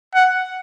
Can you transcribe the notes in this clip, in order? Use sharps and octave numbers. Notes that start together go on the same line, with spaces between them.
F#5